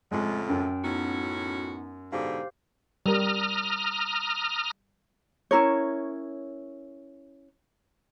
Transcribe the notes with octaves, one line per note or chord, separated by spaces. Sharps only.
F2 A2 C#3 G#3
F#2 G5
A2 B3 C#4 D#4 F#4
G#2 B2 D3 G4 C5 F5
G3 A#4 A#5 D#6 F6
C#4 E4 A#4 C#5